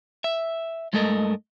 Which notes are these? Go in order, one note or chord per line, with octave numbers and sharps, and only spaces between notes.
E5
G2 G#3 A3 A4 A#4 D#5